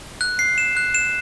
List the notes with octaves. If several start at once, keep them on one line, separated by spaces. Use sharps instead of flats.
F#6
C7
E7
F#6
E7